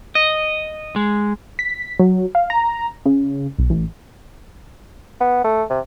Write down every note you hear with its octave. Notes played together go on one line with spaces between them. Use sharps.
D#5
G#3
B6
F#3
F5
A#5
C#3
B1
A1
B3
A3
C3